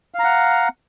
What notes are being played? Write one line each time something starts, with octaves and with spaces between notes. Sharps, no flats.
F5 F#5 A#5